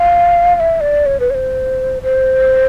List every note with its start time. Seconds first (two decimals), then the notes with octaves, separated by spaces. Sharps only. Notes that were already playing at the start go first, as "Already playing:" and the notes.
Already playing: F5
0.56 F5
0.60 E5
0.81 D5
1.06 C#5
1.20 B4
1.30 C#5
1.35 C5
2.03 C5